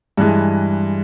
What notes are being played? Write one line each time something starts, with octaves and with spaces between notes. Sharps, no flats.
G2 E3 G#3